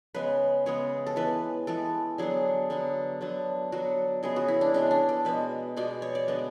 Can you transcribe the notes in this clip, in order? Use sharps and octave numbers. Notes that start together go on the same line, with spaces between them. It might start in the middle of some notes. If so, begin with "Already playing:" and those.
C#3 G#3 B3 B4
C#3 G#3 B3 C#5
A4
E3 G#3 B3 B4
E3 G#3 B3 A4
D3 F#3 B3 G#4
D3 F#3 B3
D3 F#3 B3
D3 F#3 B3 F#4
C#3 G#3 B3 G#4
F#4
E4
D4
C#3 G#3 B3 D4
D4
A4
B2 G#3 B3 B4
B2 G#3 B3 D5
C#5
D5
D3 G#3 B3